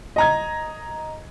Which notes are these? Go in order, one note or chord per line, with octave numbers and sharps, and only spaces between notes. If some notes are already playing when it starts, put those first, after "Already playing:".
D#5 A#5 G#6